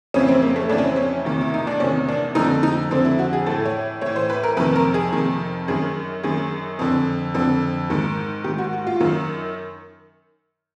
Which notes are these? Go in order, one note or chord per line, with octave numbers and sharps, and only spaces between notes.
F2 C#3 E3 C#4
C4
A#3
A3
F2 C#3 E3 D4
C#4
C4
C#4
E2 C3 D#3
E4
D#4
D4
E2 C3 D#3 C#4
D4
F2 D3 D#4
D#4
F2 D3 C4
E4
F#4
G#4
A2 E3 A4
C#5
A2 E3 C#5
C5
B4
A#4
F2 C3 D#3 B4
A#4
G#4
F2 C3 D#3
F#2 D#3 G#4
F#2 D#3 G#4
F2 D3
F2 D3
G#2 D#3
G#2 D#3 G4
F#4
F#4
F4
F#2 D#3